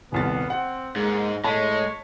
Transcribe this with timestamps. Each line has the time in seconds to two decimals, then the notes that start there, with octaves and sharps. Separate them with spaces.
0.12 D#1 C2 B3 A6
0.50 C4 F#5
0.96 G#2 G#3 A#3
1.44 A2 G#3 C#5 A5 B6